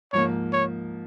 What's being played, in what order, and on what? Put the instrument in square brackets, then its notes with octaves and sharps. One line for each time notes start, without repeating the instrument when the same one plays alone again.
[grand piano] G#2 F3 A#3 [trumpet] C#5
[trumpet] C#5